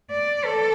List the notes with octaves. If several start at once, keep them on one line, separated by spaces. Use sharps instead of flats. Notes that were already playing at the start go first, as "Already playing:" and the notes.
D5
A4